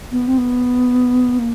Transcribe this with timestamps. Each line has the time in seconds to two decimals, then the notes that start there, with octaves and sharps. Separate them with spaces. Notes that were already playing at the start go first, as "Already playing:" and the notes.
0.11 B3
0.27 C4
0.38 B3
1.38 A#3